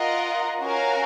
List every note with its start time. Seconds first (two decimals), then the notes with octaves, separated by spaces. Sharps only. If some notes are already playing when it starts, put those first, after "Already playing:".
Already playing: F4 A#4 D#5 F#5
0.60 C#4 F#4 A#4 F5 G#5